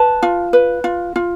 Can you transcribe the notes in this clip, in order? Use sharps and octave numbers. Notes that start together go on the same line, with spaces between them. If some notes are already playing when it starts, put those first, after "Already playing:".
Already playing: B4 A5
F4
B4
F4
F4